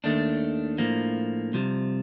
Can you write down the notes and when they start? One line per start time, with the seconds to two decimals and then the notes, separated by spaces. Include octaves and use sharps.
0.04 D#2 D#3 A3 D4
0.78 A2 F3 A#3
1.53 C2 C3 F3